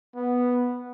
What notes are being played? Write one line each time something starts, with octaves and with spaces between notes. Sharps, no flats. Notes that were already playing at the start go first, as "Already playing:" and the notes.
B3